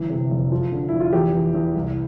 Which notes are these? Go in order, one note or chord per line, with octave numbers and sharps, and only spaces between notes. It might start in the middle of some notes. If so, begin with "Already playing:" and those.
Already playing: G1 E3
C3
F1
F3
D3
F1 E4
F4
E2 G4
E3
E2
C2